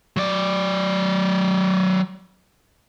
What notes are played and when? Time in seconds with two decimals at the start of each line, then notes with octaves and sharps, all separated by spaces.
0.17 F#3 D5